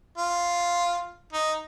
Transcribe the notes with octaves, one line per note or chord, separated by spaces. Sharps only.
F4
D#4